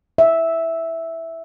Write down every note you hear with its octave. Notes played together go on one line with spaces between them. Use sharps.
E5